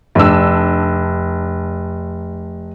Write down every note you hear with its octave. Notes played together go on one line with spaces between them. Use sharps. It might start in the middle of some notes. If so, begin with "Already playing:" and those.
F1 D4 E6